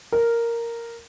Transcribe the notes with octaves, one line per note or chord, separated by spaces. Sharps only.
A#4